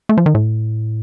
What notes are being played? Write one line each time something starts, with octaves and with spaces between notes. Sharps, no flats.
A3
F3
D#3
A2